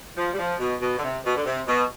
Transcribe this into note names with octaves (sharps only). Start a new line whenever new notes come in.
F3
G3
F3
B2
B2
D3
C3
B2
D3
C3
B2